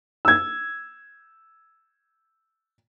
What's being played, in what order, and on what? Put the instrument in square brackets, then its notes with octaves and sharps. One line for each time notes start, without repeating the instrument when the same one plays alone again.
[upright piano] E6 G#6